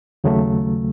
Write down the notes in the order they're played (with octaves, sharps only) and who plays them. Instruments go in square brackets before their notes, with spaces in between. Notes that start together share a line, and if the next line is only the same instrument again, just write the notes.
[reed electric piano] D#2 C#3 F#3 A3